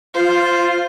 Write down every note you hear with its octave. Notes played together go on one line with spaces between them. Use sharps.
F4 C5